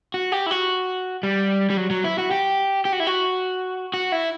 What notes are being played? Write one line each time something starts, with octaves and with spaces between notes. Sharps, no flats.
F#4
G4
E4
F#4
G3
G3
F#3
F#3
E4
F#4
G4
G4
F#4
E4
F#4
F#4
E4